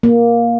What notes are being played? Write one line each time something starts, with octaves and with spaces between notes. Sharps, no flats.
A#3